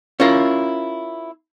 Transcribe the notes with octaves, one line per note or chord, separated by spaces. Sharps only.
C#4 E4 F4 A#4